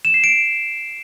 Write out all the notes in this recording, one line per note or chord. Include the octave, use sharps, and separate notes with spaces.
E7
C7
D7